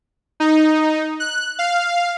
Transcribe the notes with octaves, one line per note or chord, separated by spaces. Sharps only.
D#4
F#6
F5